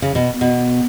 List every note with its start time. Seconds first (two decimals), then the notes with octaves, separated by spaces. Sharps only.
0.02 C#3
0.15 B2
0.41 B2